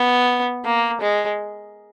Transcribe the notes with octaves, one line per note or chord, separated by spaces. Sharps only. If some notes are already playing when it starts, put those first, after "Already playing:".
Already playing: B3
A#3
G#3